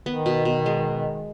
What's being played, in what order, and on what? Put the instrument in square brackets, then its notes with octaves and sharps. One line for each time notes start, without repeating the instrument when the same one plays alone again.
[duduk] D#3 [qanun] B3
[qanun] B2
B2
G#3